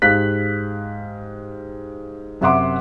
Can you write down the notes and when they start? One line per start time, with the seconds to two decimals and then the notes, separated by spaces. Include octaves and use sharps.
0.02 G#2 G4 F5 F#6 B6
2.41 F#2 C3 E5 F#5 C6 D6